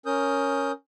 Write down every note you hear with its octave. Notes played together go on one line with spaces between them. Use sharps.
C#4 A#4 D#6 G6